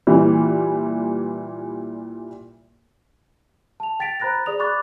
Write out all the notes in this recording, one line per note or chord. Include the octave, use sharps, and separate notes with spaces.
A#2 E3 G3
A5 F7
G5 A6 B6 D7 F7
C5 A#5 B5 F#6 A6 A#6
G#4 D5 D#6 F7
B5 C#6 D6 F#6 A6